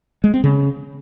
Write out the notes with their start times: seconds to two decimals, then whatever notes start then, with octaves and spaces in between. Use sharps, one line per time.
0.24 G#3
0.34 C4
0.44 C#3